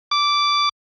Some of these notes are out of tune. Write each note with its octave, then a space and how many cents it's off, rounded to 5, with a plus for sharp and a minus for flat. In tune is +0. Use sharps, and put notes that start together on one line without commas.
D6 -10